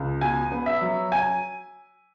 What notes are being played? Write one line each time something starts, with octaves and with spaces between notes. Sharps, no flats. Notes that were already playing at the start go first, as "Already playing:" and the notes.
Already playing: C#2
B2 G#5
B3
E5
F#3
G#5